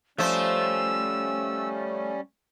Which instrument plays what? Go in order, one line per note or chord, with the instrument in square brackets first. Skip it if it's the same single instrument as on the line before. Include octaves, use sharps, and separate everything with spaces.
[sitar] F3 F4 C5 [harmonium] G3 C#4 [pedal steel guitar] A3 [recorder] E6